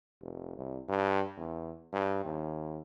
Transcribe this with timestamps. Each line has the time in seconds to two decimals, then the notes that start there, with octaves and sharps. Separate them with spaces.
0.21 F1
0.57 C2
0.89 G2
1.37 E2
1.93 G2
2.25 D#2